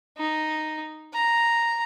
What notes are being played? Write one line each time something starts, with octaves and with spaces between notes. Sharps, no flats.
D#4
A#5